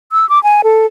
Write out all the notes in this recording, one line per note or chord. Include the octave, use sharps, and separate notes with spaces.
E6
D6
G#5
A4